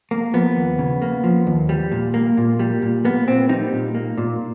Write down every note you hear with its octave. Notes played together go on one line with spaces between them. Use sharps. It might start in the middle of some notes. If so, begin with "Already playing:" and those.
A#3
F3 B3
D#2
C#3
A#3
F3
D#2
G3
A#2
A#3
A#2
G3
A#2
A#3 B3
A#2 C4
G3 D#4
A#2
A#3
A#2